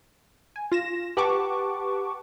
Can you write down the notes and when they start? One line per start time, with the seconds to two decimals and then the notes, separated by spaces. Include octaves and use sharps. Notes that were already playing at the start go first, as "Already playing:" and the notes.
0.56 G#5
0.72 F4 A#6 E7
1.17 G4 B4 F#5 A5 C#6 D6